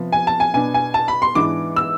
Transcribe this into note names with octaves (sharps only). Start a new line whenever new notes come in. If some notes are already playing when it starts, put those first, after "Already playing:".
Already playing: C3 F3 B3
G#5
A5
G#5
B2 B3 D4 G#5
G#5
A5
B5
C6
G#2 E3 B3 D4 D6
E6